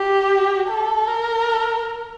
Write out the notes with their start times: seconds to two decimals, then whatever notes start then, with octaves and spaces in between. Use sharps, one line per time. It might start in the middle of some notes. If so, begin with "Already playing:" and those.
Already playing: G4
0.69 A4
1.08 A#4